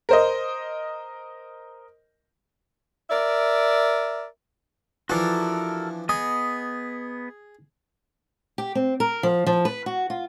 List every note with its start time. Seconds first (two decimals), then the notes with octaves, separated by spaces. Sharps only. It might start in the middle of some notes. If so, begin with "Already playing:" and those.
0.09 A#4 C5 D#5
3.10 A#4 D5 E5
5.10 E3 F3 D4 F#4 A4 A#4
6.09 B3 G#4 D#5 D#6
8.58 G4
8.75 C4
9.00 A#4
9.23 F3
9.46 F3
9.65 B4
9.86 F#4
10.10 F4